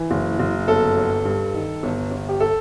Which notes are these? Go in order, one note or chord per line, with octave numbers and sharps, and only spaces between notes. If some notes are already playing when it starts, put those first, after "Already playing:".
Already playing: E3
F#1
F#1
G1 A4
G1
G2
D#3
G1
G1
G4
A4